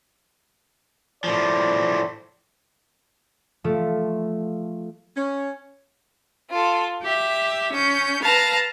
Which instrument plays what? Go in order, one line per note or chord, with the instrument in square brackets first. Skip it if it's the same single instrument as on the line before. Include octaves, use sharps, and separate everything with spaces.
[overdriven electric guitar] A2 F3 [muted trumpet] D5
[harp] F3 A3
[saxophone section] C#4
[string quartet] F4 A4
G4 E5
C#4 G6
B4 F5 A5 A#5